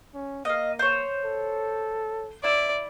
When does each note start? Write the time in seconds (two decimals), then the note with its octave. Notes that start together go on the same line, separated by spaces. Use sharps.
0.14 C#4
0.45 A#3 D#5 F5
0.79 C5 C#5
1.24 A4
2.44 E4 D5 E5